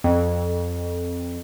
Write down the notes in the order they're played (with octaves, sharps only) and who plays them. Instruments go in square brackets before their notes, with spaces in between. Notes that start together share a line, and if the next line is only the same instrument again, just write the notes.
[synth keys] F2